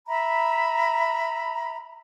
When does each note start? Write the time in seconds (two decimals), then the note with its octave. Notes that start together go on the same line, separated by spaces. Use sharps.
0.08 E5 A#5 B5